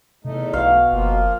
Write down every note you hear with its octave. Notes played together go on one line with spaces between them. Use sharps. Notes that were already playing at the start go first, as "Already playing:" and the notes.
E2 C3 A3 D#4
B1 B2 F5
F#1 F3 A#3 F4